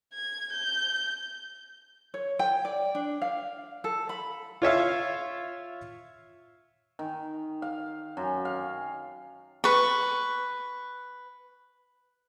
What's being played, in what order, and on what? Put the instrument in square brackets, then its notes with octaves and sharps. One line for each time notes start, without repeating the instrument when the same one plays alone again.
[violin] G#6
G6
[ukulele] C#5
G5
D5
D4
F5
A4
B5
[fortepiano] F4 C#5 E5 F5
[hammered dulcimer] D#3
F5
F#2
F5
[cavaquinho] B4 C#6